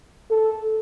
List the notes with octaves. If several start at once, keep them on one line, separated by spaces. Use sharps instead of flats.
A4